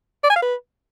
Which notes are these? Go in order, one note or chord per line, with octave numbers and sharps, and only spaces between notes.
D5
G#5
F5
B4